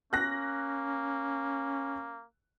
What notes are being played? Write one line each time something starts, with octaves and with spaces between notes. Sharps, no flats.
A#3 C#4 F#6 A#6